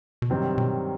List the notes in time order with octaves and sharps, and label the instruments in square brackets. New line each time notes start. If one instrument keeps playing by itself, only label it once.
[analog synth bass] B2
[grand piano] G2 D#3 F#3 C4 [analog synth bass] C3
[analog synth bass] B2